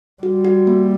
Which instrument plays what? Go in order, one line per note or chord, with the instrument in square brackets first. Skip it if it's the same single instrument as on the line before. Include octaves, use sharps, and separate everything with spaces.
[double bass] G3 [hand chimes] F#4
[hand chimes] F#4
A#3